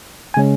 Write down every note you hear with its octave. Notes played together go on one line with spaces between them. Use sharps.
G#5
C#3 G#3 C#4